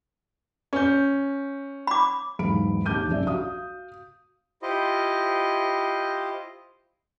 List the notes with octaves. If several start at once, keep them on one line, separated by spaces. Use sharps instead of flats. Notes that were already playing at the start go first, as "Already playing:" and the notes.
C#4 G6
B5 D6
B1 E2 G#2 B5 D7
A#1 D#2 A5 D6 G6 D#7
A#1 F#2 C#4 D#4 D5 E5
F#4 F5 D#6
E4 F4 G4 C5 D#5